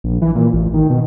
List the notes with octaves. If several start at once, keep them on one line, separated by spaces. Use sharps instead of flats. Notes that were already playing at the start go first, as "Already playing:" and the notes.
A#1
E3
A#2
A1
D#3
B2